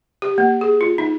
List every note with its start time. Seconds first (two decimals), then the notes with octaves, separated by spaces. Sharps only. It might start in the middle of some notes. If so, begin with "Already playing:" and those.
0.22 G4
0.38 A#3
0.61 G#4
0.81 F4
0.98 D#4